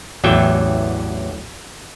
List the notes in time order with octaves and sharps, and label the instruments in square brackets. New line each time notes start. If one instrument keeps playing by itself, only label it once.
[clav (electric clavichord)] A1 E2 E3 F#3 E5 G5